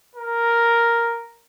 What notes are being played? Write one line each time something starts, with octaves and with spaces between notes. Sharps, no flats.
A#4